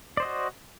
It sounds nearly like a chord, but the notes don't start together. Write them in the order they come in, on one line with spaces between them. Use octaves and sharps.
D5 C5 D#5 F#4